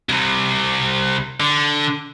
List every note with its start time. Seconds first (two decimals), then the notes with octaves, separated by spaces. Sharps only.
0.09 C2 C3
1.40 D3